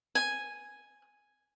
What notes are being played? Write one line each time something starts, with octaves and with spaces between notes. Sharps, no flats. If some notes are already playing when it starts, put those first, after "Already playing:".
G#5